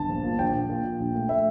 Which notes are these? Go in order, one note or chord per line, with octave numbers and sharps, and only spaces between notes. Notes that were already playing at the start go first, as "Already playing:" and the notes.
Already playing: G1 A5
A#1
A#2
A#1 G5
A#1
A#2
A#2
A#1
A3
A3 E5